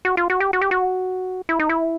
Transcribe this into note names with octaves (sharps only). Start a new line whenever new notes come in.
F#4
F4
F#4
G4
F#4
G4
F#4
E4
D#4
E4